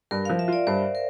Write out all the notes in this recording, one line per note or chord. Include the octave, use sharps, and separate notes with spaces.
G2 A#4
F3 F5
E5
F4 D5
G2 C5
A#4